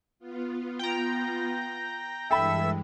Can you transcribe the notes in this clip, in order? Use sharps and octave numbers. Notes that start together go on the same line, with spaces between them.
B3 F4
G5 A#5
G2 E3 G#3 A4 E5 G5 B5 E6